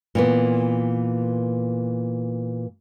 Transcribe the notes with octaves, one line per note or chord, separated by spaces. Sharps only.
A#2 E3 B3